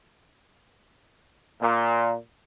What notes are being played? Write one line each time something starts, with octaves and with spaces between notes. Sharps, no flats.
A#2